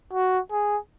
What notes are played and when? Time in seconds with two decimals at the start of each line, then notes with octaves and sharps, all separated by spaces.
0.14 F#4
0.52 G#4